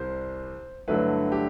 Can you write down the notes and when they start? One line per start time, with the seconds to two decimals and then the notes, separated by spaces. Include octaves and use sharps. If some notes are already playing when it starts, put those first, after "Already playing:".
Already playing: C2 C3 G3 C5
0.88 G2 D3 F#3 A3 E4 B4
1.32 G4